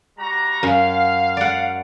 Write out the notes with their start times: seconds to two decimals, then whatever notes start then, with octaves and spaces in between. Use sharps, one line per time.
0.18 G3 F#4 A#5
0.63 F#2 F5
1.37 D5 F#5